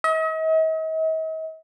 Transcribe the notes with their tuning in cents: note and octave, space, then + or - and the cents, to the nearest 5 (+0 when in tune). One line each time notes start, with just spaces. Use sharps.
D#5 +45